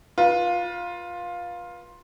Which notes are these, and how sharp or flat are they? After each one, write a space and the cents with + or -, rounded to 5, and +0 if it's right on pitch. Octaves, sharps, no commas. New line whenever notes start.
F4 +10 B4 -30